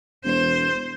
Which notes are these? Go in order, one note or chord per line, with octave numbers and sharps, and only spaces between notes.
E1 C5